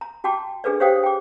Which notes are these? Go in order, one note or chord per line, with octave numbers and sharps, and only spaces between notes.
A#5
F#4 G5 A5 D6
D4 G#4 A4 B4 D5
G4 C5 C#5 F5 G5 D#6
G5 D6